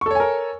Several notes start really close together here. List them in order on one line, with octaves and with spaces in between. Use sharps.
C#6 A4 C#5 G#5 A#4